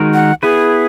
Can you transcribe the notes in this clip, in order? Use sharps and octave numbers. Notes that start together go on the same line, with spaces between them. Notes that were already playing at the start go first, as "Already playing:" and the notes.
Already playing: D#3 G#3 D#4 F#4 A#4
F#5
B3 E4 G#4 B4